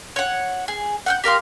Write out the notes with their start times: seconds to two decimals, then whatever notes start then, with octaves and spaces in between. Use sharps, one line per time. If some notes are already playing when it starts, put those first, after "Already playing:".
0.16 C#5 F#5
0.68 G#4
1.06 F#5 F#6 G6
1.24 G4 A#4 F5 C6